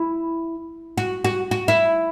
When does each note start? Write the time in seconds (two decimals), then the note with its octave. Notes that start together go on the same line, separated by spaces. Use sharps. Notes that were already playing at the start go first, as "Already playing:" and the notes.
Already playing: E4
0.98 F#4
1.24 F#4
1.51 F#4
1.68 E4